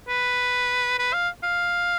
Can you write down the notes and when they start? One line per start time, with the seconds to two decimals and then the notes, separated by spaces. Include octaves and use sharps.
0.08 B4
0.99 B4
1.13 F5
1.43 F5